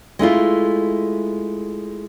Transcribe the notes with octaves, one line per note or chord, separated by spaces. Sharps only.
G#3 A3 E4 F4